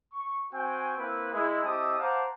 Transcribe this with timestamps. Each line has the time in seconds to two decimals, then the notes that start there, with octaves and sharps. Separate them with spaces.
0.13 C#6
0.53 C4 F#4 G5 G#5
0.97 A#3 C4 E4 B4
1.33 G#3 E4
1.63 C4 E4 G4 D#5 A5 D#6
1.99 C5 F5 F#5 A5 A#5 D6